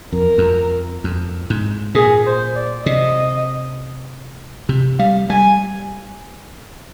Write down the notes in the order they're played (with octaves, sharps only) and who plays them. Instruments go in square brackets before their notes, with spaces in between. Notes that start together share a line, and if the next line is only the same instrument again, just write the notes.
[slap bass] F2 [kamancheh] A#4
[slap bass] F2
F2
G#2
[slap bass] A#2 [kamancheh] G#4
[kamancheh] C5
D5
[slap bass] C3 [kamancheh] D#5
[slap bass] C3
[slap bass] G3 [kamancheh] F5
[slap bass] G3 [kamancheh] G#5